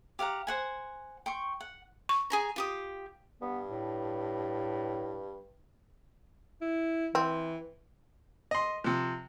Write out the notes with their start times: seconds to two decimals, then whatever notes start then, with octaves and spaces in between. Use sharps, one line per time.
0.19 G4 F5 F#5 A#5
0.47 C5 F#5 G#5
1.26 G5 C6 C#6
1.61 F#5
2.09 C#6
2.30 G#4 G#5 A#5
2.56 F4 G4 D#6
3.42 G2 B3
3.68 A2
6.62 E4
7.15 E3 C4
8.51 D#5 C6
8.84 C3 F3